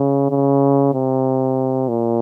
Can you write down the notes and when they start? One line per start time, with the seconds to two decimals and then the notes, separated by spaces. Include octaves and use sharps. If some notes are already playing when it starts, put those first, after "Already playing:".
Already playing: C#3
0.30 C#3
0.94 C3
1.89 A#2